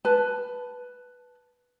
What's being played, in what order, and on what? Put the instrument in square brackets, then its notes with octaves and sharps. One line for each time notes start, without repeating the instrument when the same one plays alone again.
[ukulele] B4 A5